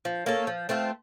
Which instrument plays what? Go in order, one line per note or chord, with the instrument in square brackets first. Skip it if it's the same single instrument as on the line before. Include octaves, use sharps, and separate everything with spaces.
[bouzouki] F3
A#3 C#4 A4
F3
A3 C4 F4